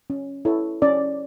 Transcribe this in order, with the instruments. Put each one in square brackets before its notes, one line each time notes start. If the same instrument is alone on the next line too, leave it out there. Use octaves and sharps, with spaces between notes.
[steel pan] C#4
E4 A4 C#5
C#4 D5